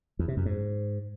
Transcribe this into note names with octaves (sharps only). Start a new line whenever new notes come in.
E2
C3
F#2
G#2